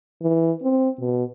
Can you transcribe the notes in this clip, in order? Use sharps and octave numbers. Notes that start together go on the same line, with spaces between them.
E3
C4
B2